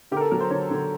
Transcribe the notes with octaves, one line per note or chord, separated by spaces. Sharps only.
D3 G4
A#4
A4
F#3 A#4
C5
D3 C#5
D3